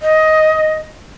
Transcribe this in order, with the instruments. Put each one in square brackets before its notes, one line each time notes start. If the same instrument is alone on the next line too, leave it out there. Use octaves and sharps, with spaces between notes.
[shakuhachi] D#5